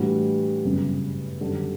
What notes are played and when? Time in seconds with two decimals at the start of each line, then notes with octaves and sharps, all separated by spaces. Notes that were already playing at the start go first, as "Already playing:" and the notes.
Already playing: A2 E3 G3 D4 F#4
0.64 G1 F#2 C#3 G3
1.41 F#2 D3 G3